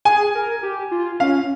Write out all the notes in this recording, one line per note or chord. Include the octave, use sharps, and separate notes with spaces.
G#4 G#5
A#4
G4
F4
C#4 F5